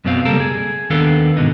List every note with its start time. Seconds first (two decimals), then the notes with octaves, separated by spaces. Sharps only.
0.05 F#2 B2 B3 C4 F5
0.25 C#2 G3 A#3 A4 A#4
0.40 G#4
0.90 D#2 D#3 B3 D4 A4 F5
1.37 G#2 B2 D3 D#4